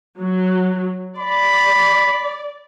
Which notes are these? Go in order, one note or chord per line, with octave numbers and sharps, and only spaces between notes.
F#3
D5 B5